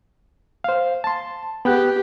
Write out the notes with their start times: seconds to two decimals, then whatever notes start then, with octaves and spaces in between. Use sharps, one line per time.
0.64 C5 F5
1.04 A5 C6
1.65 B3 G4 G5 F#6